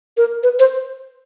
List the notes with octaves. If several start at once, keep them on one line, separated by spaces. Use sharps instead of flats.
A#4
B4
C5